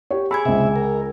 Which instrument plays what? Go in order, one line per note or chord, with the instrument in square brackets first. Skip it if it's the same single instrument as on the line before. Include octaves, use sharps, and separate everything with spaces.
[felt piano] G4 C#5
[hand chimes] G#4 G#5 G#6 [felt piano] B5 E6
[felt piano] C#2 D#5 [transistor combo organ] C3 E5
[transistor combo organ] A#4